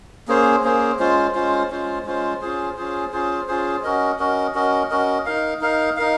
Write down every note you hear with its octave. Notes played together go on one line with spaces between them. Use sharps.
A#3 C#4 G#4 C5
A#3 C#4 G#4 C5
G#3 C#4 F4 C5
G#3 C#4 F4 C5
G#3 C#4 F4 C5
G#3 C#4 F4 C5
C#4 F4 G#4 C5
C#4 F4 G#4 C5
C#4 F4 G#4 C5
C#4 F4 G#4 C5
C#4 F#4 A#4 D#5
C#4 F#4 A#4 D#5
C#4 F#4 A#4 D#5
C#4 F#4 A#4 D#5
D#4 A#4 F5
D#4 A#4 F5
D#4 A#4 F5